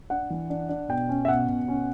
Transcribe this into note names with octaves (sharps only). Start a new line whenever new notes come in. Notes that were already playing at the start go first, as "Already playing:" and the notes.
D4 F#5
E3
D4
D4
B2 G5
C#4
E5
B2 F#5
B2
C#4